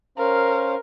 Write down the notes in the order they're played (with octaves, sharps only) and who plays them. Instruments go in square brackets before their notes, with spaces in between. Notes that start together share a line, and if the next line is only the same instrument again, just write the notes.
[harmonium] C#4 C5 F5 [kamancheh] A#4